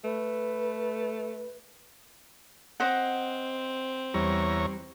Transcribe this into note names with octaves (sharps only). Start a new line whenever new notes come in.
A3 B4
C4 C5 D#5 F#5
E2 G3 C#5 A#5